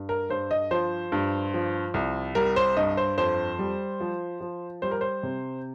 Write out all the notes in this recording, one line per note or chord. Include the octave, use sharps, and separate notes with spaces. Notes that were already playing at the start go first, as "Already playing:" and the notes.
Already playing: G2
A#4
G2 C5
D#5
F3 C5
G2
F3
C2
G3 A#4
C5
G2 D#5
C5
F2 C5
G3
F3
F3
G3 C5
A#4
C5
C3